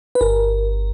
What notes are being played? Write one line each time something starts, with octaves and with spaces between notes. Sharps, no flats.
B4
G1 A#4